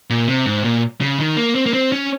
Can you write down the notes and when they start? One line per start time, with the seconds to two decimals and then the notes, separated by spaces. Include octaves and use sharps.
0.10 A#2
0.28 C3
0.46 G#2
0.64 A#2
1.01 C#3
1.20 D#3
1.37 A#3
1.55 C4
1.66 A#3
1.73 C4
1.92 C#4